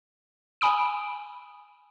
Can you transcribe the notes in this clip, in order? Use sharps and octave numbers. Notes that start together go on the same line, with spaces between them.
G#5 B5 D#6 D7